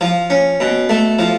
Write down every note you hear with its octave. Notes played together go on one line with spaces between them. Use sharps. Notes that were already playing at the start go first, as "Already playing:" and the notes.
F3
C#4
B2
A3
F3